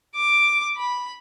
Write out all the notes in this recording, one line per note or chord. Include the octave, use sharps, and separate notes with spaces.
D6
B5